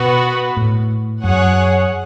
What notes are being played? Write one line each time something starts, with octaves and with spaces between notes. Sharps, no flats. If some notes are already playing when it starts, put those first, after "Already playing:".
Already playing: B2 B3 F#4 B4
A2
F#2 G#4 C#5 F#5